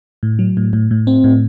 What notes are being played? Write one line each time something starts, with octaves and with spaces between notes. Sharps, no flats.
A2
F#3
A2
A2
A2
C4
A2